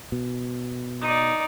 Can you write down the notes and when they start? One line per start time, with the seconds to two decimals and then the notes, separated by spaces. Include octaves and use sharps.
0.12 B2
1.02 D#4 D5